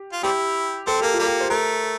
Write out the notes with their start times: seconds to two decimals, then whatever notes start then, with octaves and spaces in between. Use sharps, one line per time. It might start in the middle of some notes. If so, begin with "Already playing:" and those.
Already playing: G4
0.13 F4
0.23 G3 C4 E4 G4
0.87 C4 A4
1.00 A#3 G4
1.14 F4
1.19 G3 A#3
1.27 G4
1.41 C5
1.50 A3 A#4